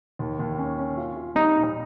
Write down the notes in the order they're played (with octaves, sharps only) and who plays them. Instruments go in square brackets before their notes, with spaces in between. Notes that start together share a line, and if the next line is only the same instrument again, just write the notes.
[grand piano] D#2
D#2
C#4
C#4
F4
F4
[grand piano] G3 [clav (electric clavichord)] D#4
[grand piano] A#2